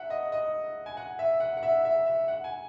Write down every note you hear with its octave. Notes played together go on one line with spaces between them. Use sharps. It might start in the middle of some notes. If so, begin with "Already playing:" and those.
Already playing: E5 F#5
D#5
D#5
G#5
F#5
E5
F#5
F#5
E5
E5
E5
F#5
G#5